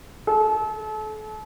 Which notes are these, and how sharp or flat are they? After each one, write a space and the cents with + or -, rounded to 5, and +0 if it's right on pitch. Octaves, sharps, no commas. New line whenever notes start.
A4 -35